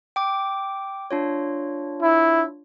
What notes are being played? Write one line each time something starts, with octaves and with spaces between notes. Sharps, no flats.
G5 D6
D4 F4 C#5
E4